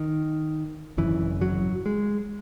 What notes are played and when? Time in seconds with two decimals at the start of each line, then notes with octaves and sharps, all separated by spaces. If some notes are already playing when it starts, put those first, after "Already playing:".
Already playing: D#3
0.98 G#1 F#2 C#3 E3
1.41 F#3
1.86 G#3